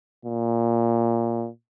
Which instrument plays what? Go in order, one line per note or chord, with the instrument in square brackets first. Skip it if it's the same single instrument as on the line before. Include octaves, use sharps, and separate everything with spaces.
[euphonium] A#2